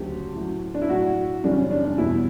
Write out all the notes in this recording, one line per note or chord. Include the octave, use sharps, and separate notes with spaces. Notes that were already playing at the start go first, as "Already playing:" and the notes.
Already playing: D2 C#3 F#3 G4
A2 F#3
D4
E4
A2 F#3 F#4
F#2 C#3 E3 G3 D4
C#4
D4
D4
E2 B2 G3 E4